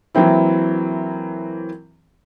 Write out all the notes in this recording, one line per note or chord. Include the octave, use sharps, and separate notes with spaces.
E3 F#3 A#3 C4 E4